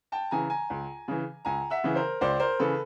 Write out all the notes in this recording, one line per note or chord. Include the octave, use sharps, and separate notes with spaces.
G5 A5
C#3 E3 G#5 A#5
G#5 A#5
C#2
C#3 E3
C#2 G#5 A#5
E5 F#5
C#3 E3
A#4 C5
C#2 C5 D5
A#4 C5
C#3 E3 A4 B4